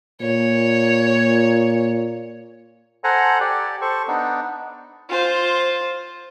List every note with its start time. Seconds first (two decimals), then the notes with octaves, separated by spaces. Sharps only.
0.21 A#2 C#5
3.04 A4 C5 F#5 G#5 A#5
3.40 G4 D5
3.81 A4 C5 C#6
4.08 B3 D4 D#4
5.10 F4 C5